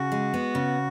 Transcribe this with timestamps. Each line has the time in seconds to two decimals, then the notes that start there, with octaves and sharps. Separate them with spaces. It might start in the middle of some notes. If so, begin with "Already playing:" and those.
Already playing: C#3 F#4
0.12 G#3
0.34 B3
0.55 C#3